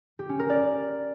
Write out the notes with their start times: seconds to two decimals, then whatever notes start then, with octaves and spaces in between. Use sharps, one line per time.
0.19 G4
0.29 C#4
0.39 A#4
0.50 D5